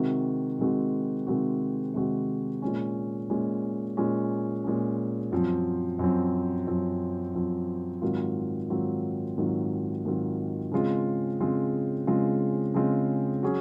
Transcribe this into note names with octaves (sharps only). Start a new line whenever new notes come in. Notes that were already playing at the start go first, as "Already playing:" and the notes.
Already playing: C3 D#3 G#3 C4 F#4
C3 D#3 G#3 C4 F#4
C3 D#3 G#3 C4 F#4
C3 D#3 G#3 C4 F#4
A#2 G#3 C#4
A#2 G#3 C#4
A#2 G#3 C#4
A#2 G#3 C#4
F#2 F3 C4
F#2 F3 C4
F#2 F3 C4
F#2 F3 C4
G#2 D#3 F#3 C4 F4
G#2 D#3 F#3 C4 F4
G#2 D#3 F#3 C4 F4
G#2 D#3 F#3 C4 F4
C#3 G#3 C4 F4
C#3 G#3 C4 F4
C#3 G#3 C4 F4
C#3 G#3 C4 F4
F#3 C#4 G#4